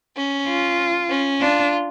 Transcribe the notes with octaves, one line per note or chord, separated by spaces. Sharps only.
C#4
F4
C#4
D4 F4